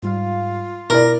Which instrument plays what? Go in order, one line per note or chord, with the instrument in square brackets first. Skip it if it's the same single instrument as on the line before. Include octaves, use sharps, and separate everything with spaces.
[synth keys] G#2 G3 F5 [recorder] F4
[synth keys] B2 [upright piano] E4 D5 [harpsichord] A#4